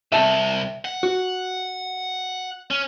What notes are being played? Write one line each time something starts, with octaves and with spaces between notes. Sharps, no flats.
C2 C3 E5 A5
F#5
F#4
C#4